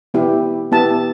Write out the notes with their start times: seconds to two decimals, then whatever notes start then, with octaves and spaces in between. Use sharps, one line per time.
0.14 B3 E4 G4
0.72 B3 E4 G4 A5